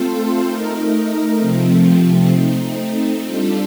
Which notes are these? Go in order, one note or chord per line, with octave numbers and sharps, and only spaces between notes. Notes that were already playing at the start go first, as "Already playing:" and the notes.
Already playing: A3 C4 F4 A4 C5
A3 D#4 A#4
C3 F3 A3 C4
A3 C4 D#4
G3 D4 F4 A4